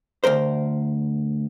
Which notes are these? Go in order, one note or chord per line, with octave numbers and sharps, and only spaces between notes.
D2 C#3 A#4 C5